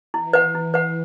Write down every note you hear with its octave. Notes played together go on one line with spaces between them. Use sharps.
E3 E4
B4 F#5
E4
B4 F#5